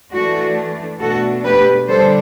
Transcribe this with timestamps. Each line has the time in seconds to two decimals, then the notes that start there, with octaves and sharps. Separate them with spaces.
0.13 E3 A3 D4 F#4
1.01 B2 A3 D4 F#4 A4
1.45 G4 B4
1.88 D3 G3 D4 A4 C5